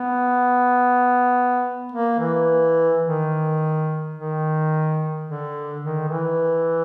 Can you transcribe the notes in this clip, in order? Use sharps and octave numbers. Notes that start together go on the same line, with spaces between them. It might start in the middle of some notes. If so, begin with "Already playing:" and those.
Already playing: B3
A#3
E3
D#3
D#3
D3
D#3
E3